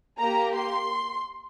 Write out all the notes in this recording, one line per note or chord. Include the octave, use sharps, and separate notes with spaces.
A#3 G4 A#5
C6